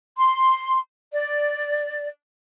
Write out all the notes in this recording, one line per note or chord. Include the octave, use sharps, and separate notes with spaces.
C6
D5